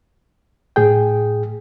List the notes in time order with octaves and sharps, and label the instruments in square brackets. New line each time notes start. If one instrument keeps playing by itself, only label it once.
[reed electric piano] A2 G#4 G5